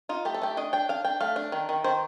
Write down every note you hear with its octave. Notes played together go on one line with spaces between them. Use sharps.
D#4 F4
A3 G4
A4
A3 G4
D4 D#5
D4 G5
D4 F5
D4 G5
A3 F5
D4
D#3
D#3
D#3 C5